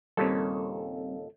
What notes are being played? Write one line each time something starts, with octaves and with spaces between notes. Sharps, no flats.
D#2 A#2 C#3 G3 C4 A4